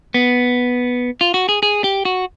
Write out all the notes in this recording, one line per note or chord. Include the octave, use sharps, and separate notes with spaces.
B3
F4
F#4
G#4
G#4
G4
F#4